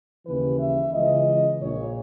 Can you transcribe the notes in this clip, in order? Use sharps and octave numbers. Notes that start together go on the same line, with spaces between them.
D#2 C#3 E3 B4
E5
C#2 C#3 E3 D#5
A#1 A#2 C#5